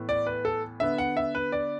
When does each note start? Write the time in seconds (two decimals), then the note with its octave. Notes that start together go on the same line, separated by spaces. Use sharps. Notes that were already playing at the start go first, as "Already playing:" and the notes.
Already playing: A2 E3 B3
0.09 D5
0.27 B4
0.45 A4
0.80 D3 B3 E5
0.98 F#5
1.17 E5
1.35 B4
1.52 D5